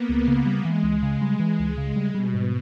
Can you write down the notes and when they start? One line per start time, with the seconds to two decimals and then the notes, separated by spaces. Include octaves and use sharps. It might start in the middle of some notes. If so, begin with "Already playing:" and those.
Already playing: A#3 B3
0.09 C#2
0.27 C#3 A#3
0.46 G3
0.65 E3 G#3
0.83 C#2
1.02 C#3
1.22 G3
1.40 E3
1.59 C#2
1.78 C#3
1.96 G3
2.15 B2 G3
2.34 G#2